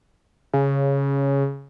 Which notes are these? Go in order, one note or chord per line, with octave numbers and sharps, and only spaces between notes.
C#3